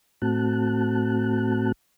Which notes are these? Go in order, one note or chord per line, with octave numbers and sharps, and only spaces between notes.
A2 A3 C4 F#4 A5 F#6